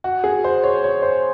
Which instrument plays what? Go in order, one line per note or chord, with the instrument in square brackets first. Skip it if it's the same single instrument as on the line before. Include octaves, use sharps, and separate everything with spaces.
[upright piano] F#4
G#4
C5
C#5
C#5
C5